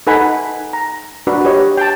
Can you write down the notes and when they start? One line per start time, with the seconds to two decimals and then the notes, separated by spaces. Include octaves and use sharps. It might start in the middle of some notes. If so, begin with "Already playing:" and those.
0.07 D#4 A4 B4 F#5 G#5 B5
0.73 A#5
1.27 D4 F#4 B4
1.45 G4 B4 C#5 D#5
1.77 G5 A5